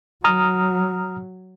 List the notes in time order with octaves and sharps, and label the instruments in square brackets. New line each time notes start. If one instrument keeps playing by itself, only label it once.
[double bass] F#3 [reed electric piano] A#5 D#6 F6